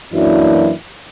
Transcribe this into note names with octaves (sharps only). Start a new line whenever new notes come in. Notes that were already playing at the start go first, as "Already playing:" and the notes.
F#2 E3 F#3 A#3 D4 E4